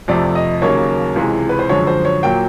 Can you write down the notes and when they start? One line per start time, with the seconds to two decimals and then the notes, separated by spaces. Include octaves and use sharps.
0.08 F2 C3 F3 A3 D5
0.35 D#5
0.62 D#2 C#3 F#3 A#3 C#5
1.16 C#2 C3 E3 G#3
1.49 B4
1.59 C5
1.69 F#2 D3 F3 G#3 C#5
1.87 C5
2.05 C#5
2.23 A#2 F#3 A#3 G5